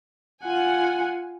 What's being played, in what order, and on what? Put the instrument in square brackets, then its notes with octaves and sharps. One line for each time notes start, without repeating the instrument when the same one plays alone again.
[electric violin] F4 F#5 [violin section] G#5